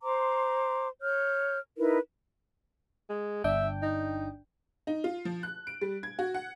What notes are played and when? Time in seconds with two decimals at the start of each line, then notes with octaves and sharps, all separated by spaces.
0.02 C5 A#5 C6 D6
1.01 C#5 F6 G6
1.77 D#4 E4 A#4 B4
3.10 G#3
3.44 G1 D4 E5 G5
3.82 D#4
4.87 D#4
5.04 F4
5.25 F3
5.43 F#6
5.67 D7
5.81 G3
6.03 G#6
6.19 F#4
6.34 F#5